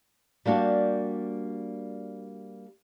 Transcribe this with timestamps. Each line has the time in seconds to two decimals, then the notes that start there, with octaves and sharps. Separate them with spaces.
0.46 G3 A#3 D4 F#4 G4